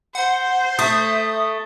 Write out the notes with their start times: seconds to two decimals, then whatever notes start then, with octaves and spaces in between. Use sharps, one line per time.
0.15 C5 F#5
0.79 A3 E5 D#6